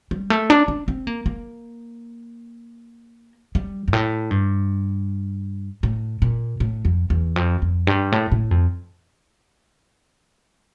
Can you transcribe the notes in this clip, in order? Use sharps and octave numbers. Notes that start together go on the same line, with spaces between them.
G3
A3
D4
D4
C4
A#3
A#3
G3
G2
A2
G2
A2
A#2
A2
F2
E2
F2
F2
G2
A2
A2
F2